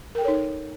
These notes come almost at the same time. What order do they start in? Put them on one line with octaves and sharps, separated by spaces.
A#4 G5 A4 C#5 D#4